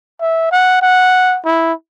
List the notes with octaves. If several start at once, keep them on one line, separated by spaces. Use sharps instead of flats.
E5
F#5
F#5
E4